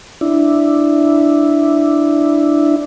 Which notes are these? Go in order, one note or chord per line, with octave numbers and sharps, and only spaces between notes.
D4 E4